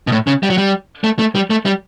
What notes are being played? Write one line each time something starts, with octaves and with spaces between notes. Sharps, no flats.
B2
A2
C#3
G3
F#3
G3
A3
A3
G3
A3
G3